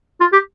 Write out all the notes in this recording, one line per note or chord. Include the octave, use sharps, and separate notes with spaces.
F4
G4